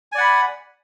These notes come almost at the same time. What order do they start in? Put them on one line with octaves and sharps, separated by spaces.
G#5 D5 F#5 B5